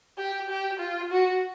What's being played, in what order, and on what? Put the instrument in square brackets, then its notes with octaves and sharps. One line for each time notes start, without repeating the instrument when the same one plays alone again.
[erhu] G4
G4
F4
F#4